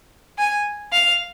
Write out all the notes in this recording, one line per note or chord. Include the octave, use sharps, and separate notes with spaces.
G#5
F5